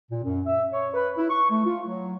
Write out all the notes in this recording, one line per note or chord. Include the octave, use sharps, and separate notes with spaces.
A#2
F#2
E5
C#5
B4
E4
C#6
A3
F4
F#3